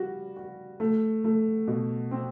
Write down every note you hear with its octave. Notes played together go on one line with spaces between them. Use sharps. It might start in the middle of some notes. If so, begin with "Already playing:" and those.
Already playing: G3 F#4
F#4
A3
A3
B2
C4